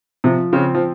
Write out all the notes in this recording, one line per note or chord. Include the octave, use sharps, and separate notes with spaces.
C3 F3
C#3 C4
F3